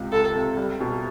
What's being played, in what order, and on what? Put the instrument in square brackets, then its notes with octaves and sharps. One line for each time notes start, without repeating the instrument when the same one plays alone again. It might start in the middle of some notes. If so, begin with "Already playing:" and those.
Already playing: [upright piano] C#2 C3
[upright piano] C#2 [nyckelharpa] A4
[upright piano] C3
G3
B2